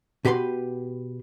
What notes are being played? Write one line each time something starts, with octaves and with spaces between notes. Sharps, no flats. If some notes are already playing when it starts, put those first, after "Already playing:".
B2 G4 B4 B5 C6